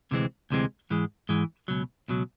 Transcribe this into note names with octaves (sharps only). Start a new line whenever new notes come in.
D2 C3 E3 G#3 C4
D2 C3 E3 G#3 C4
G#2 E3 G#3
G#2 E3 G#3
C#2 B2 F#3
C#2 B2 F#3